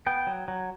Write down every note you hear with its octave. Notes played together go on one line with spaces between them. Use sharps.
B3 G5
F#3
F#3